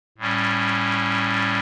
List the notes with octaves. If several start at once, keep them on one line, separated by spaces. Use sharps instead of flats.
A2 G3 C#4